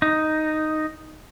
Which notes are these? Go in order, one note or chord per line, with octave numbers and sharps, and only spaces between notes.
D#4